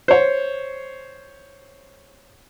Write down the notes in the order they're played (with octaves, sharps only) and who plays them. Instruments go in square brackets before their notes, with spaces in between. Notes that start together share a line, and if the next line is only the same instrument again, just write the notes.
[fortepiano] C5 C#5